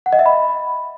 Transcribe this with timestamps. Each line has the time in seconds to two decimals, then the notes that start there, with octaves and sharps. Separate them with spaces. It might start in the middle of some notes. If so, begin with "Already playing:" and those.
0.06 F#5
0.13 D#5
0.19 E5
0.26 B5